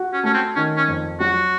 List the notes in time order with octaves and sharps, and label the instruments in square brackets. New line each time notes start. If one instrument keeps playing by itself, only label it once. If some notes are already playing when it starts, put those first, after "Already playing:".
Already playing: [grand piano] F#4
[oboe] C#4
[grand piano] A3 [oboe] C#4
[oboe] C4
[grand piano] D#3 [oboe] C#4
[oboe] C#4
[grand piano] F2
[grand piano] F#3 [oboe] F#4